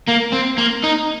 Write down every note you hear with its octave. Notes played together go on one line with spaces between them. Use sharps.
A#3
C4
A#3
D#4